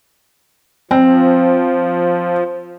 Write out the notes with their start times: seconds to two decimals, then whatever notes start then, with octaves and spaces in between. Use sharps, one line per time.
0.91 F3 C4